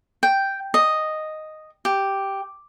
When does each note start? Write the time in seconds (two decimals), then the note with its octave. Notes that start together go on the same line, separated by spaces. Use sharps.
0.23 G5
0.74 D#5
1.85 G4